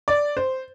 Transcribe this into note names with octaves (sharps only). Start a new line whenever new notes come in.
D5
C5